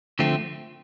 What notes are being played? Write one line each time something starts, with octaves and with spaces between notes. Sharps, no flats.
D3 F3 A3 C4